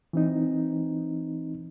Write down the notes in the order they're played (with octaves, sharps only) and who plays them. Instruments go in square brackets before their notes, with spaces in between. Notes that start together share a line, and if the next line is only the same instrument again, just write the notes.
[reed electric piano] E3 C4 D#4